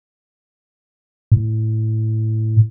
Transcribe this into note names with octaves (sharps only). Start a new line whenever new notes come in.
A2